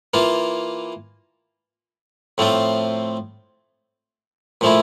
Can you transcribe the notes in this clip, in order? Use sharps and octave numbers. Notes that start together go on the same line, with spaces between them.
E3 A#3 F4
A2 F3 A3 C4 F4
A#2 F3 A3 E4